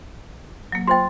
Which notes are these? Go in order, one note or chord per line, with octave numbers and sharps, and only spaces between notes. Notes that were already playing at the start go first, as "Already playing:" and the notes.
F#3 A#3
F4 C5 G5 C6 A6